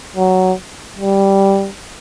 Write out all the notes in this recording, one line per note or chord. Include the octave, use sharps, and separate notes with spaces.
F#3
G3